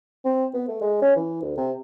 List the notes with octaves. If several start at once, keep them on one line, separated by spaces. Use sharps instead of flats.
C4
B3
A3
G#3
C#4
E3
D2
C3